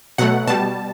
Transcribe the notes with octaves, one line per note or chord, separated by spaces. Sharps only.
B2 F#3 A3 F#5
B2 G3 A5